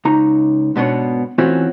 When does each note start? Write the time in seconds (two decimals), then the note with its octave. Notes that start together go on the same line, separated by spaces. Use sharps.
0.05 C#2 D#4 A#5
0.76 G#2 B2 B3 D4 C#5
1.38 E3 A3 C4 C#4 F4 F#4